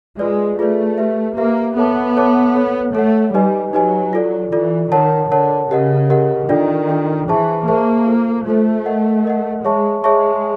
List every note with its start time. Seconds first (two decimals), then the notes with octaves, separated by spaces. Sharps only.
0.19 G#3 F4 G#4 B4 D5
0.59 A3 F4 G#4 B4 D5
0.98 G4 B4 E5
1.37 A#3 G4 B4 E5
1.77 B3 A4 C#5 E5 A5 D6
2.16 A4 C#5 E5 A5 D6
2.55 A4 C#5 F#5
2.95 A3 A4 C#5 F#5
3.34 G3 D#4 G4 B4 D#5 G#5
3.73 F#3 D#4 G4 B4 D#5 G#5
4.13 F4 A4 D5
4.52 E3 F4 A4 D5
4.92 D#3 A#4 C#5 F#5 A5
5.31 D3 A#4 C#5 F#5 A5
5.70 C#3 G4 A#4 D#5 F#5
6.10 G4 A#4 D#5 F#5
6.49 D#3 D4 F4 A4 D5 G5
6.89 D4 F4 A4 D5 G5
7.28 E3 G#4 C5 E5 A5 C#6
7.68 A#3 G#4 C5 E5 A5 C#6
8.06 F4 A4 C5
8.46 A3 F4 A4 C5
8.86 A#4 D#5 F#5
9.25 A#4 D#5 F#5
9.64 G#3 G#4 C#5 E5 A5 C#6
10.04 G#3 G#4 C#5 E5 A5 C#6